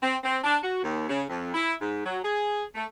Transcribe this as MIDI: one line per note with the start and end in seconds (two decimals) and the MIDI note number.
0.02 0.16 60
0.23 0.38 60
0.44 0.57 62
0.63 0.83 66
0.83 1.07 39
1.08 1.22 49
1.29 1.50 41
1.54 1.73 64
1.81 2.03 44
2.04 2.19 54
2.23 2.64 68
2.75 2.85 57